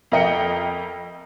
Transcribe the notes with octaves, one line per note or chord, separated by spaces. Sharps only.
F2 A#4 D#5 G5 C#7